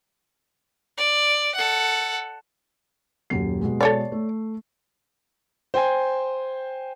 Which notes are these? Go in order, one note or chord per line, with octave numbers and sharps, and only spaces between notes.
D5
A4 F#5
D#1 F#2 C7
B2 G#3
A4 C#5 D5
A3
C5 G5 G#5